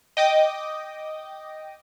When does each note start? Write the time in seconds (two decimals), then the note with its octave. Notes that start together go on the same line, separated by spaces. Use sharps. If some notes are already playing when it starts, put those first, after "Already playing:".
0.17 D#5 G5 D6 D#6